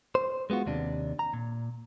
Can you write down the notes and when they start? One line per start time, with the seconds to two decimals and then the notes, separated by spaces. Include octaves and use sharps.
0.15 C5
0.50 G#3 B3 F4 F#4
0.66 D#2 C3 D4
1.19 A#5
1.33 A#2